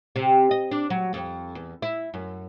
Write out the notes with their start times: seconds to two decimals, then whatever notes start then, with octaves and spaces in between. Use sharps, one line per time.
0.16 C3
0.51 D#5
0.71 D4
0.90 F#3
1.14 F2
1.55 E2
1.82 E4
2.14 F#2